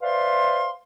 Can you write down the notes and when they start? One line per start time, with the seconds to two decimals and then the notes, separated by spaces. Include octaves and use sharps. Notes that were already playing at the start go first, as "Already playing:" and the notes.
0.02 B4 C5 D5 E5 F5 C6